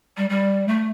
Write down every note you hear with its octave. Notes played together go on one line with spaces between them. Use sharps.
G3
G3
A3